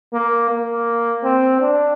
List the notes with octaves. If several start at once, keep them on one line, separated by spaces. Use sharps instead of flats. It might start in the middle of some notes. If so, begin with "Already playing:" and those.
A#3
A#3
C4
D4